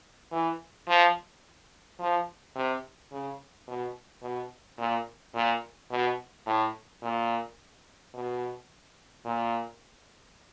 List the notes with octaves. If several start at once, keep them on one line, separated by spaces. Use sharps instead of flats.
E3
F3
F3
C3
C#3
B2
B2
A#2
A#2
B2
A2
A#2
B2
A#2